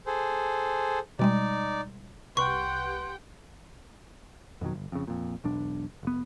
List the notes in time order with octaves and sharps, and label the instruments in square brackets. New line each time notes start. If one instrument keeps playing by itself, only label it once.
[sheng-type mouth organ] G#4 A4 C5
[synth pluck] B2 G3 G#3 [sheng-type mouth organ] D#4 D5
[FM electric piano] C2 B4 F#6 [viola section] G4 F#5 G5 [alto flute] C6 [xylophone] C#6
[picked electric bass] F2 B2 D#3 F#3
G1
F2 C#3
F2 A#2
E1 B1 D4
F1 B3